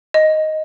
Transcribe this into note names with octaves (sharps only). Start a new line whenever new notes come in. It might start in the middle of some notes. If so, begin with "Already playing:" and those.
D#5